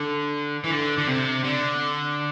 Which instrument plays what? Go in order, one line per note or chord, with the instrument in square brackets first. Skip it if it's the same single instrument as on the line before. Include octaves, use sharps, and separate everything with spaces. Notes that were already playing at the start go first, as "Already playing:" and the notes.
Already playing: [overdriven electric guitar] D3
E3
D3
D3
C3
D3